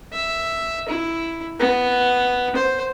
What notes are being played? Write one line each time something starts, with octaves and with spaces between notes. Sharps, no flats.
E5
E4
B3
C5